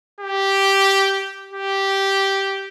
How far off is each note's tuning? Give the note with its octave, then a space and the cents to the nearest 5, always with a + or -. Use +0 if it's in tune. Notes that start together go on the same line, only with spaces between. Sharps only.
G4 -5
G4 -5